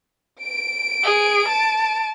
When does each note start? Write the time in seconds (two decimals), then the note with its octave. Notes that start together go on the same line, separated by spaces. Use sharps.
0.41 D7
1.04 G#4
1.48 A5